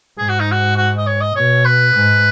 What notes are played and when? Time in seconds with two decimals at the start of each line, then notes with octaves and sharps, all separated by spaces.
0.18 G#2 G#4
0.29 F#4
0.40 D#4
0.51 F#4
0.77 F#4
0.98 D#5
1.07 C#5
1.21 D#5
1.35 B2 C#5
1.65 B4
1.94 G#2